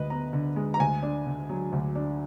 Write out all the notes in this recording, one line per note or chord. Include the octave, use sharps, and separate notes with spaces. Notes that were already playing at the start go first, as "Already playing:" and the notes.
Already playing: D2 D3 G#3 B4 D#5
B3 A#5
D3
G#3
A#5
D2 G#5
D4
D3
F#3
D2
D4